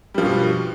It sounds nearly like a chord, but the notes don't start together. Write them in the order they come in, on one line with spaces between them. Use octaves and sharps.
G3 F3 G2 B2